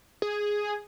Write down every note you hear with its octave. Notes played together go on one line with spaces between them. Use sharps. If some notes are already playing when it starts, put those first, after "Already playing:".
G#4